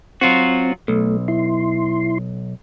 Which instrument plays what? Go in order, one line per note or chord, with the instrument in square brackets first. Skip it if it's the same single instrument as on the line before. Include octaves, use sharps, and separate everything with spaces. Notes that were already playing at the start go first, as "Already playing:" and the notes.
[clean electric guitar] F#3 F4 F#4 [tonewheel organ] C4
[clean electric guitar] B1 [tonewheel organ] A3
[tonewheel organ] E4 C6